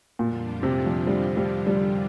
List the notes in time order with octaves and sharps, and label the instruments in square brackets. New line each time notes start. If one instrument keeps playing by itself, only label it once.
[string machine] F2 D3 G3 D4 F4 [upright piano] A#2
[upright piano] C3
F3
G3
G3
G3